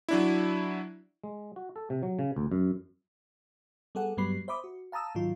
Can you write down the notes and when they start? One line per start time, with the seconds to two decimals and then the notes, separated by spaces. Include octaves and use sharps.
0.09 F#3 D4 E4
1.24 G#3
1.56 F#4
1.76 A4
1.90 C3
2.03 F#3
2.19 C#3
2.36 D2
2.52 F#2
3.95 G3 B3 G#4 A4 F#5
4.17 G2 F#3 G3 B3 B5 C7
4.48 C5 E5 B5 D6 D#6
4.64 F#4
4.92 F5 A5 A#5 D#6 E6
5.15 G#2 D#3 F#3 F4